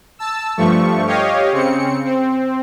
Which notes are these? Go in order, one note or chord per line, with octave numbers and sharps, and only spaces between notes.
A5 E6
G2 F3 A3 C#6
G4 C#5 D#5 F5
C#3 C4 C#7
C4